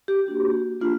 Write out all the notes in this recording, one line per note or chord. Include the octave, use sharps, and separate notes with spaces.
G4
A#3 D4 F#4
A#3 D4 F4